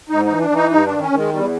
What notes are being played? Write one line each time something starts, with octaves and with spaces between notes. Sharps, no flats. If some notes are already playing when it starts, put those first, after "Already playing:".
G#2 D#4
D#4
E3
D4
E3
D#4
G2 D#4
D#3 D4
C#4
D#3
G#3
E2 G3